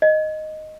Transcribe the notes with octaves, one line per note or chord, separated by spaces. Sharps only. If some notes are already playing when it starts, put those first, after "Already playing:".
D#5